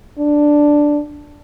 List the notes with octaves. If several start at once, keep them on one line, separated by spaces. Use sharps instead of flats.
D4